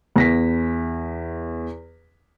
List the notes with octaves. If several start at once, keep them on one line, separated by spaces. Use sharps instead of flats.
E2 A#6 B6